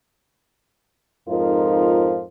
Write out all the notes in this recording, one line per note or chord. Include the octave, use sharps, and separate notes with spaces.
F2 G#2 F3 D#4 F4 A#4